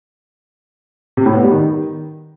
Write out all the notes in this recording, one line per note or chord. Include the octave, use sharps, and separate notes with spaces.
C3
A2
B3
G3
D#3